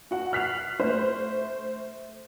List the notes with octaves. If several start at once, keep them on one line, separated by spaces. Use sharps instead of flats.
F#4 F#5
F6 F#6 B6 C7 F7 F#7
A3 C5